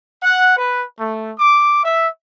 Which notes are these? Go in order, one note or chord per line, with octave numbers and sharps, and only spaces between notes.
F#5
B4
A3
D6
E5